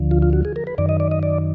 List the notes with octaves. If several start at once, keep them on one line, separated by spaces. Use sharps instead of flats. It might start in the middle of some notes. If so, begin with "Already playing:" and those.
Already playing: D2 D3 F3
F4
F4
F#4
G#4
A#4
B4
F#2 D#3 D5
D#5
D5
D#5
D5